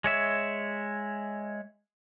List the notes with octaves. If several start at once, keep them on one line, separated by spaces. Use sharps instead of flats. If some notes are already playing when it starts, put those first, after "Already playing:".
G#3 C#5 E5